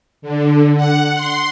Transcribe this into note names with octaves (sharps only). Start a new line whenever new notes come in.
D3
F#5
C6